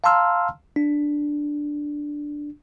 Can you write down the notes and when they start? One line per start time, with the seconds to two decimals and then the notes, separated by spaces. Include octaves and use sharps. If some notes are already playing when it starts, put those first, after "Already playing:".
0.04 F5 A5 A#5 C6 E6 F6
0.76 D4